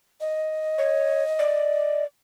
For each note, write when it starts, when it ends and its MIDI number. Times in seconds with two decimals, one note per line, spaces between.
0.21 2.03 75
0.78 1.24 73
1.39 2.04 74